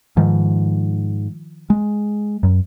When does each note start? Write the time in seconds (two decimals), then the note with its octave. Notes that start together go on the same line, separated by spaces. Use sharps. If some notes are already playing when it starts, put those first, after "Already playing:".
0.17 G#2 D#3 F3
1.70 G#3
2.43 F#2